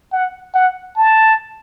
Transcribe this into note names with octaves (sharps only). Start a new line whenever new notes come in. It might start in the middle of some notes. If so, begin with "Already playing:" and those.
F#5
F#5
A5